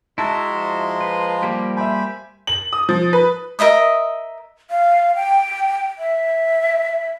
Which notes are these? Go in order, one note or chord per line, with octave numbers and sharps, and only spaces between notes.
G#3 E4 F#4 E5 A5 A#5 C6
F3
B4
G3 A#3 G4
C5 E5 G#5 B5
F#7
D#6
F3
B4
A#4 D#5 E5 D#6
F5
G5
E5